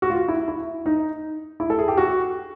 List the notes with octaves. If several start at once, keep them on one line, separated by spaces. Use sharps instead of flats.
F#4
F4
E4
E4
D#4
E4
A4
G#4
G4
F#4